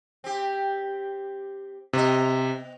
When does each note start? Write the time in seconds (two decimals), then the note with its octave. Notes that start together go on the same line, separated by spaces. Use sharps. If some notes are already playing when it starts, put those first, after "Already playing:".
0.24 C4 G4
1.93 C3 B3 D#5